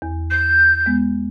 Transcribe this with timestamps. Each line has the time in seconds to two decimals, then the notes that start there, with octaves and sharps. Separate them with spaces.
0.02 E2
0.30 G6
0.86 G#3 B3